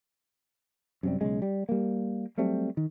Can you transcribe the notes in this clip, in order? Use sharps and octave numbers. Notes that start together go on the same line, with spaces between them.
F#2 C3 G3
B1 C#3 G#3
G3
G3 A#3
F#3 G3 A3 C4
D#3